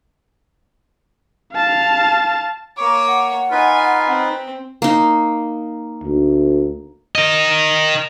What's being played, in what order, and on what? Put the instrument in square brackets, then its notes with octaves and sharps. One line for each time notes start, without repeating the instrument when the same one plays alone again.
[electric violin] F5 A5
[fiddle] A#3 C#5 [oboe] D6
[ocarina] F#5
[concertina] D#4 B4 [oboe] F4 [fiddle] G#5
[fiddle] C4
[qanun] A#3 D#4
[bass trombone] D2
[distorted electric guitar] A#4 D#5